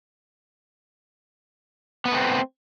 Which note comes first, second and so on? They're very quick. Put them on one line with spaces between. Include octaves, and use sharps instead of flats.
B3 B4 A3 C4